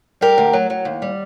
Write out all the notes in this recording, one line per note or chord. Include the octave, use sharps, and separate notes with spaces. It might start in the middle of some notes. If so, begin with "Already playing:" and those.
G3 G4 A#4
D2
F#3
F#3
D#2
G3